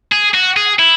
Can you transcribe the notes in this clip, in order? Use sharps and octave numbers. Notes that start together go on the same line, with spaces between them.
G#4
F#4
G#4
E4